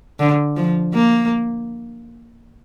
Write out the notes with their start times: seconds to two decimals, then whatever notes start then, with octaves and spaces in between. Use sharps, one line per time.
0.20 D3
0.56 F3
0.94 A#3